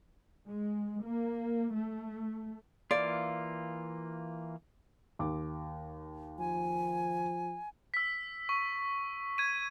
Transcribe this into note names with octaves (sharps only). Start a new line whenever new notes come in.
G#3
A#3
A3
E3 A#3 F4 D5
D#2 D6
F3 G#5
E6 B6
C#6
G#6 D#7